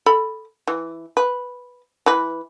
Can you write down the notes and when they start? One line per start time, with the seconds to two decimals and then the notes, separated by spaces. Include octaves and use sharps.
0.06 A4 B5
0.68 E3
1.17 B4
2.06 E3 B4